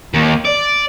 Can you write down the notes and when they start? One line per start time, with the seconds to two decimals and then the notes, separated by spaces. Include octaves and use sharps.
0.14 D#2
0.45 D5